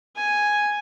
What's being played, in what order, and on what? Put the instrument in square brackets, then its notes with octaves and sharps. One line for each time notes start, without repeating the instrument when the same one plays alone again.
[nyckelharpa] G#5